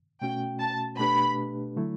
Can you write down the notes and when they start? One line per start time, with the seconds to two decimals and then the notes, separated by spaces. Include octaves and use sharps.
0.22 B2 A3 C#4 F#4 G5
0.60 A5
0.99 B2 A3 D4 G4 B4 B5
1.76 D3 F#3 A3 E4